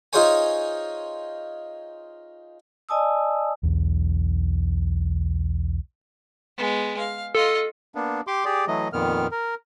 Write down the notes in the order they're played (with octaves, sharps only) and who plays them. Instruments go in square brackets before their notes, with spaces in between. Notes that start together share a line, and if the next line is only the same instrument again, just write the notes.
[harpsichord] D#4 F4 G#4 C5 C#5 G#5
[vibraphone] D5 D#5 G#5 A5 D#6 E6
[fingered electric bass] B1 E2
[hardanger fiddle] G#3 B3
F5
[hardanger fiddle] F4 D#5 [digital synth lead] A4
[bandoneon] A#3 B3 D4
G4 C6 D6
G4 G#4 D5
E3 F#3 A3 D#5
F2 A#2 D#3 B3 F6
A#4